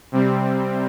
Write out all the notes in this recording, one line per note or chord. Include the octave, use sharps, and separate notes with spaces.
C3 G3 C4